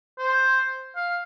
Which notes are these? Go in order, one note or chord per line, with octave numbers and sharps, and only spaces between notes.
C5
F5